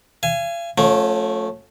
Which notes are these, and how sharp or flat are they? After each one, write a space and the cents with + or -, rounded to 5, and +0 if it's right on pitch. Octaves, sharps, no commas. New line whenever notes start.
F5 -40 G#5 +0
F3 +40 A3 +0 C#4 -10